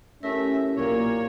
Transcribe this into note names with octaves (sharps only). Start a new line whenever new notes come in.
A3 C#4 E4 G4 A#4 E5
B1 A#2 A#3 C#5